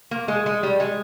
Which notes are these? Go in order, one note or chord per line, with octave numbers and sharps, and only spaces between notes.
A#3
G#3
G#3
G3
G#3